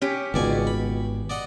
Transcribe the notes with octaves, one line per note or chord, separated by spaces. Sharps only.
C#4 G4
G#1 C#2 B2 D5 G#5
B5
D5 D#5 F#5